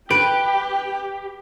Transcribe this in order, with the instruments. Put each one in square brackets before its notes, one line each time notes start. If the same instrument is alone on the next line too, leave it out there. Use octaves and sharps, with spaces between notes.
[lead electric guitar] G4 [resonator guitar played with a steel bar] B4 [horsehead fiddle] G5 [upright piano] D7